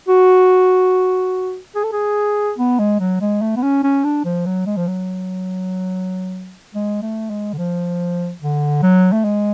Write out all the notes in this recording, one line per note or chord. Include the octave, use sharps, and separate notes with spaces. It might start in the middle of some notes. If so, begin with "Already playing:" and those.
F#4
G#4
A4
G#4
B3
G#3
F#3
G#3
A3
B3
C#4
C#4
D4
F3
F#3
G#3
F3
F#3
G#3
A3
G#3
D3
F3
D3
F#3
A3
G#3